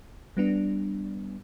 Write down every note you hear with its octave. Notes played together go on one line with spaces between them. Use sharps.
G3 B3 D4